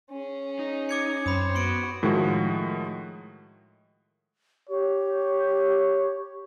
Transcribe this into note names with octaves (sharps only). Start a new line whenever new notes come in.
C#4 G#4
D#4
D6 G#6 C#7
F#2 C4 C5 C#5 B5 D#6
B3 F#4 C#6 C#7 D7
A2 D#3 F3 G#3 F#4
G4 C#5